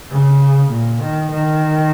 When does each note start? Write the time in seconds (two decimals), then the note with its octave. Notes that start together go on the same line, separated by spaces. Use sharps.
0.10 C#3
0.70 A#2
1.01 D#3
1.31 D#3